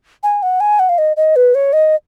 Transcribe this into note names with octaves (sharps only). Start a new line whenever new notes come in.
G#5
F#5
G#5
F#5
F5
D#5
D#5
B4
C#5
D#5